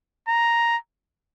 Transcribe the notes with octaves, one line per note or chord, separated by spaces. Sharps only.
A#5